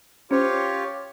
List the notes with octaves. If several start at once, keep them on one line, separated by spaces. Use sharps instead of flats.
C#4 F4 G4 C5 C#5